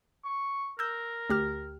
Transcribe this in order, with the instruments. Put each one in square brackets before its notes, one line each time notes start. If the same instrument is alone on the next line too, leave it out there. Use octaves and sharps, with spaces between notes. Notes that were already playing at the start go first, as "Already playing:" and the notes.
[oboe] C#6
[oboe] A#4 [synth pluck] E6 G6
[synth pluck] D2 G4 F6